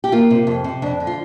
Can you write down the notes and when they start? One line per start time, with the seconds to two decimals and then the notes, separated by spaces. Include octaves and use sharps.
0.04 G4
0.12 A#3 F4
0.30 C3
0.47 F2
0.64 C3
0.82 F2 D4
1.00 D3
1.07 F4